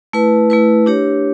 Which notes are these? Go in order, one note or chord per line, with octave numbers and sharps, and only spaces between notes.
A3 E4 B4
A3 E4 B4
D4 G4 C#5